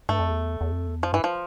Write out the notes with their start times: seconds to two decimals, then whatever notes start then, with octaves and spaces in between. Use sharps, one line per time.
0.09 G2 A3
0.19 F2
0.30 E2
0.61 E2
0.72 F2
0.87 E2
1.03 F2 F3
1.13 G2 E3
1.24 F3